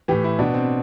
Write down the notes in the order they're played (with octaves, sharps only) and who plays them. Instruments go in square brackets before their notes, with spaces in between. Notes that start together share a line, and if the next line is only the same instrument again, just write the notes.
[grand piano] A2 E3 G4
E4
B2 D4
C4